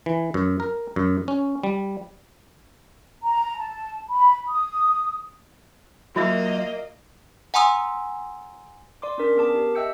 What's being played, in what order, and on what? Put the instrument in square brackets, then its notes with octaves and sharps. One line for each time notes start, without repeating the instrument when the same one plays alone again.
[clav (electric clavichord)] E3
F#2
A#4
F#2
C#4
G3
[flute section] A#5
A5
B5
D#6
[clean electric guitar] F#3 F4 [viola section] A#3 [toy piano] F#4 E5 E6 [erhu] D#5
[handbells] F#5 G#5 A#5 C6 D#6 E6
D5 C6 D6
C#4 D4 A#4 D5
B3 G#4 A#4 A5 D6
G4
D#5 E5 G5 E6 G6 C#7